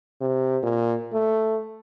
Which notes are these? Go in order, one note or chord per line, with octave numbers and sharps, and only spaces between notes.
C3
A#2
A3